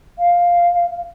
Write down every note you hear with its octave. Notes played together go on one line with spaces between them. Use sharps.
F5